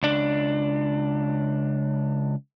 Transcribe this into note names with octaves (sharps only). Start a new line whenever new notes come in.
C#2 D4